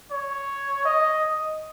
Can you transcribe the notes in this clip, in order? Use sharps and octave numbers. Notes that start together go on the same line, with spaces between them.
C#5
D#5